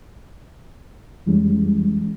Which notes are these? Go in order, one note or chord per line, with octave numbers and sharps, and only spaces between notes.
F2 E3 G3 G#3 C#4